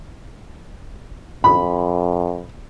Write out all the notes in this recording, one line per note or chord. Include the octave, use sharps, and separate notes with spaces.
F2 B5